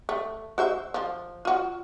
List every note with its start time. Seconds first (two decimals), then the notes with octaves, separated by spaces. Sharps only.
0.09 A3
0.58 F#4 C5 E5
0.94 F3
1.45 F4 F#4